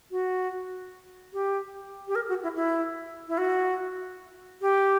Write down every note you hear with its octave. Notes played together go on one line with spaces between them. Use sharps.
F#4
G4
G4
A#4
F#4
E4
E4
E4
F#4
G4